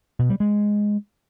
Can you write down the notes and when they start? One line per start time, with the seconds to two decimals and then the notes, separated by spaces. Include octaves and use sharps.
0.19 B2
0.30 G3
0.40 G#3